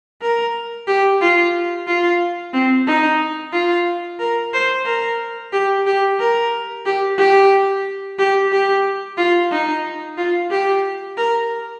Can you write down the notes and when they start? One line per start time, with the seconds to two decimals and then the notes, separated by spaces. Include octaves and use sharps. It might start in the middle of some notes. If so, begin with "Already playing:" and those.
0.22 A#4
0.87 G4
1.21 F4
1.87 F4
2.53 C4
2.87 D#4
3.53 F4
4.19 A#4
4.54 C5
4.86 A#4
5.53 G4
5.86 G4
6.19 A#4
6.86 G4
7.18 G4
8.18 G4
8.52 G4
9.18 F4
9.52 D#4
10.18 F4
10.51 G4
11.17 A#4